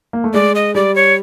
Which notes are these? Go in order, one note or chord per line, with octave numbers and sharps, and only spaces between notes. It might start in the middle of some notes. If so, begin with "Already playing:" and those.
A#3
A3
G#3 D5
D#5
G3 D5
C#5